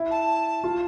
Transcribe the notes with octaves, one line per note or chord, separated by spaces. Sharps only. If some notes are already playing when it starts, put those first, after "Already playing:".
Already playing: E4
A5
F4